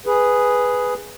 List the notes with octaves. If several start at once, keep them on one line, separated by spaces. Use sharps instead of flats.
G#4 B4